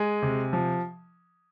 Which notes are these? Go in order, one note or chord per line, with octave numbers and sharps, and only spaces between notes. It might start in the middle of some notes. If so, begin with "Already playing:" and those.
Already playing: G#3 G#5
C3
F3